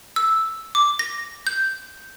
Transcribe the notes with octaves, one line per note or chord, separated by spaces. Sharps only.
E6
D6
A#6
G6